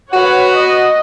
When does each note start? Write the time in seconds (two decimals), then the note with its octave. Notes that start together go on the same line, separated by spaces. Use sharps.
0.13 F#4 B4 C#5 F#5
0.57 D#5